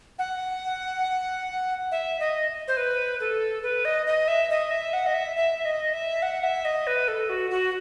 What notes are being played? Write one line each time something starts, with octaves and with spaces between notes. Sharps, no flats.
F#5
E5
D#5
C5
B4
A4
B4
D#5
D#5
E5
D#5
E5
F#5
D#5
E5
E5
D#5
E5
F#5
E5
D#5
B4
A4
F#4
F#4